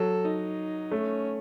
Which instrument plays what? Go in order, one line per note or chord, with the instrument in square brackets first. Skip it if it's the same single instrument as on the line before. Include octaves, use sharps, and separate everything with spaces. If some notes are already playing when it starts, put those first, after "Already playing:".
Already playing: [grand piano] F#3 [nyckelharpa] A4
[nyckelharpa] D#4
[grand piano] A3 [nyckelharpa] C#4